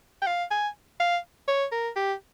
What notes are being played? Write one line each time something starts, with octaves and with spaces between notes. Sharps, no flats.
G5
F5
G#5
F5
C#5
A#4
G4